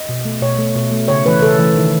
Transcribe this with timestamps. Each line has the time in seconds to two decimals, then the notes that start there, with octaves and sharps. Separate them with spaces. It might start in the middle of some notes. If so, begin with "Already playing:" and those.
Already playing: D#5
0.09 B2
0.25 A3
0.42 B2 C#5
0.58 A3
0.75 B2
0.92 A3
1.08 C#3 C#5
1.25 E3 A3 B4
1.42 C#3 A4
1.59 E3 A3
1.76 D#3